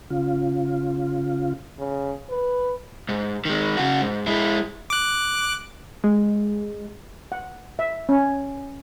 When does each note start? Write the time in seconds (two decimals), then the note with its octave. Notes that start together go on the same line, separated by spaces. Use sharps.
0.10 C#3 F4
1.79 C#3
2.30 B4
3.09 G#2
3.45 D#3 G#3
3.77 C#3 F#4
4.01 G#2
4.27 G#3 E4
4.90 D6 F#6
6.04 G#3
7.32 F#5
7.79 E5
8.09 C#4